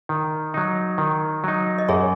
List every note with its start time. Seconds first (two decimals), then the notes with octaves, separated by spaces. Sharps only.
0.09 D#3
0.54 F#3 D#4
0.98 D#3
1.44 F#3 D#4
1.78 D#5
1.89 F#2 G#4 C#5